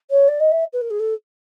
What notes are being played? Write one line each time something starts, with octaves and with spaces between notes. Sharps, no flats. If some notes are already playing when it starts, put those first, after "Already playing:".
C#5
D5
D#5
E5
B4
A#4
G#4
A4